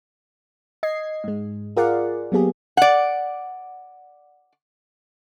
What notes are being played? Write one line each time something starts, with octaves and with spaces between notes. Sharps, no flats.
D#5 G#6 C7
G#2 G#3
F4 G#4 A#4 D5 F5 F#5
F#3 A#3 B3 G4 G#4
D5 F#5